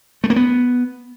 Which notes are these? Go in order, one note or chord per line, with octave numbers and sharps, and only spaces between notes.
A3
A#3
B3